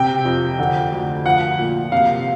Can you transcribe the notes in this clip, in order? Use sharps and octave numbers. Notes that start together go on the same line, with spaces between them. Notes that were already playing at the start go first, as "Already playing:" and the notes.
Already playing: C3 G5
F2
D3
D2
F3 F#5
A#2
C3 F5